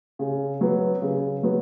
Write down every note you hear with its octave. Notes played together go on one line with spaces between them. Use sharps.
C#3
F#3 B3
C#3
F#3 B3